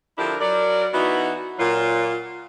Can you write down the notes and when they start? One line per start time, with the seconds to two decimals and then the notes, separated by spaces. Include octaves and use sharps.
0.18 D3 F3 D4 E4 G4 A#4
0.40 F#3 A#4 D5
0.93 E3 B3 D#4 E4 F#4
1.59 A#2 F#3 F4